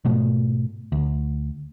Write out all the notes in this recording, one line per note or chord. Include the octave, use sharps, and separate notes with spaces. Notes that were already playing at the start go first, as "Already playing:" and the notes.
G#2 B2 A3
D2